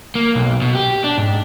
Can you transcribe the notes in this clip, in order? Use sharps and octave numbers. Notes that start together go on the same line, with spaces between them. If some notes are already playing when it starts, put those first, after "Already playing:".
A#3
B1
B2
G4
D4
G#2